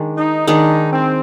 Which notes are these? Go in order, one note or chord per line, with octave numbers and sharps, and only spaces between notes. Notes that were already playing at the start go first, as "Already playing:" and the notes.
Already playing: D#3 G#3 D4
D#4
D#3 G#3 D4 D#4
C4